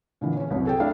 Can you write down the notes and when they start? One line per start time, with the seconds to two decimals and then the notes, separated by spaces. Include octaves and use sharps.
0.21 A#2 D3 E3
0.36 C#4 C#5
0.51 C2 F#2
0.65 G#4 A4 G5
0.79 A3 D4 E4 E5 F5